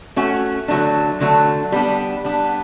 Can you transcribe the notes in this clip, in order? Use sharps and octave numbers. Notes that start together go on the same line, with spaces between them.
A3 C#4 F#4
D3 F#3 A3 D4
D3 F#3 A3 D4
G3 B3 D4
G3 B3 D4